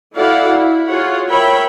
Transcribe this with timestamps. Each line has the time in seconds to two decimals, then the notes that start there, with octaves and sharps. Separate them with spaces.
0.15 E4 F#4 A4 D5 F5 F#5
0.56 E4
0.88 F4 F#4 G#4 C#5 F#5
1.29 A#4 C#5 E5 G5 B5